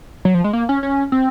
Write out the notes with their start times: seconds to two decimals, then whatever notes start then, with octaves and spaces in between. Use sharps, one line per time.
0.25 F#3
0.34 F3
0.44 G#3
0.53 A#3
0.69 C#4
0.83 C#4
1.12 C4